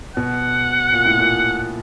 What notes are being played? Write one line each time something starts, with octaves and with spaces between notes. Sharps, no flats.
B2 F#5
A#2
A2
A#2